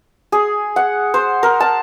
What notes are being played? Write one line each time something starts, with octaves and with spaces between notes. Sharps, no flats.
G#4
F#5
C5
A#4
A5